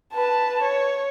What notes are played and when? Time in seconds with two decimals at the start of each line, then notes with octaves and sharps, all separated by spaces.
0.14 B4 A5
0.62 C#5